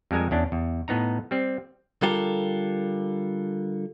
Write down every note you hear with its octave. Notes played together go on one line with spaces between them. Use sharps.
F2 G3 G#3 A#4 G#5
E2 C#4 D4
E2
A2 B3 D#4 A#5
G3 C4
D3 G3 F4 G4 A4 A#4